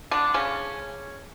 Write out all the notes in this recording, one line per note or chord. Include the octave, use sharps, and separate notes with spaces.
D3 D4
C#3 C#4